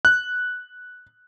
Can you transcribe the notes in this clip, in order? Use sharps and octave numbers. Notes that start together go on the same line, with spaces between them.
F#6